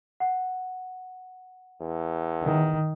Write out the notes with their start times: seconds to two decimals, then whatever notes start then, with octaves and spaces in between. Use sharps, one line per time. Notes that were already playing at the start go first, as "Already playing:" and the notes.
0.20 F#5
1.80 E2
2.44 D#3